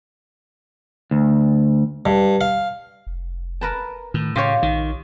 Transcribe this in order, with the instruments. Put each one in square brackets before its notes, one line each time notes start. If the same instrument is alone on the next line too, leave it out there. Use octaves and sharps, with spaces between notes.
[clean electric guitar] D2
[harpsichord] G2
F5
[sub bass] F1
[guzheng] A#4 B4 A5
[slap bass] A2 [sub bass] D#3
[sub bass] A2 [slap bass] C#3 [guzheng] F4 G4 C#5
[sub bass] A#1 [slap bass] D#3